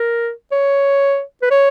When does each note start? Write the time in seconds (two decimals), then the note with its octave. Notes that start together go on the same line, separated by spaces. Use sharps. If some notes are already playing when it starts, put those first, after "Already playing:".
Already playing: A#4
0.52 C#5
1.42 B4
1.51 C#5